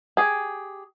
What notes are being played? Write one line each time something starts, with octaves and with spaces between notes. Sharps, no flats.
G4 G#4